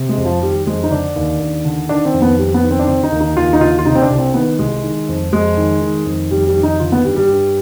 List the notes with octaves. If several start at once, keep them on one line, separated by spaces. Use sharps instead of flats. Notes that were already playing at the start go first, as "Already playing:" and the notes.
Already playing: C3
G#3
F2
F3
D#3 G3
F2 G#3
D#4
D3 D4
D#2
D#2
D3
D#3 D4
C4
F2
B3
F2 G3
B3
D#3
C4
D4
D3 C4
D#4
D#2
D#4
D#2 F4
D#4
D3 F4
F4
C3 D#4
C4
D4
C2
C4
D#3 B3
C2 G#3
D#3
F2
F2 G#3
D#3
D#3
F2
F2 G3
G3
D#3
D#4
D3 F4
B3
G2 G3
G3
G2